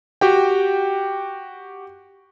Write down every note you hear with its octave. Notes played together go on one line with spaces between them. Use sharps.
F#4 G4 G5